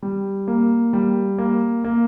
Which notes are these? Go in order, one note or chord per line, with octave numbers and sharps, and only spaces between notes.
G3
A#3
G3
A#3
A#3